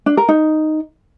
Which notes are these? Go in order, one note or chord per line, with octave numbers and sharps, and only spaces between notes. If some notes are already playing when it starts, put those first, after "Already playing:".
D4
A#4
D#4